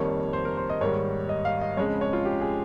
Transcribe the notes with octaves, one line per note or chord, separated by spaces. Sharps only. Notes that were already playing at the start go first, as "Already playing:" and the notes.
Already playing: F2 D#3 G3 A#3 C#5
C5
A#4
C5
D#5
G#2 D#3 G3 A#3 C#5
D#5
F5
D#5
F2 C#3 G#3 C#5
C#5
F4
G4
G#4